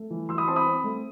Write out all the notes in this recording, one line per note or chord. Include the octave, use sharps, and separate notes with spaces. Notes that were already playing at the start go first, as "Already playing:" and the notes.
Already playing: A3
E3
E3 C6 E6
B5 D#6
C4 A5 C6
B5 D#6
C4
A3